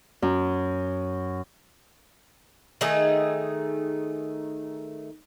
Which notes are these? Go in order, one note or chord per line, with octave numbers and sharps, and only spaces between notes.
F#2
D#3 A3 D#4 G#4